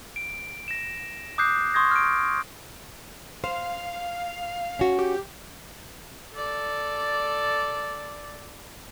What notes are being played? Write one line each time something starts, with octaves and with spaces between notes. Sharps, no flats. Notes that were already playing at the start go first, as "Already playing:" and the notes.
D7
A#6 E7
D6 D#6 F#6 G6 C7
C6 C#6 D#6 G6 G#6 A#6
F6 D7
C5 F5
C#4 F#4
G4
A4 D5